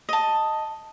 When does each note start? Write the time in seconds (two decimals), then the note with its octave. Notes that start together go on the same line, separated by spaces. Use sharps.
0.09 D#5 A5